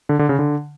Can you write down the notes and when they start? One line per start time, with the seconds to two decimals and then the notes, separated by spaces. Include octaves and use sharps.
0.09 D3
0.19 D3
0.29 C#3
0.39 D3